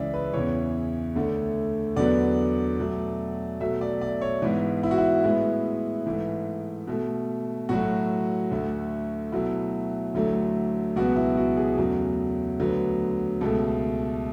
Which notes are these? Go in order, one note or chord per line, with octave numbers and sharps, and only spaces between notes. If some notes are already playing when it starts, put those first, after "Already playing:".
Already playing: C#2 C#3 E3 D5 E5
B4
E2 C#3 E3 C#5
D2 D3 A3
E2 D3 F#3 B3 D5
B2 F#3 A3
B2 F#3 A3 E5
D5
D5
C#5
G#2 E3 B3
E4
F#4
E4
A2 G#3 B3
G#2 E3 A3
B2 A3
A2 F#3 A3 F#4
D2 D3 A3
B2 F#3 A3 E4
D2 D3 F#3 A3
C#2 B2 F#3 B3 F#4
E4
F#4
G#4
E2 C#3 F#3 A3
D2 D3 F#3 B3
C#2 B2 A3 A4